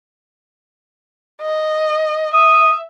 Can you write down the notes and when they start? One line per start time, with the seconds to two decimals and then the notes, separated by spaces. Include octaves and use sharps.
1.41 D#5
2.34 E5 D#6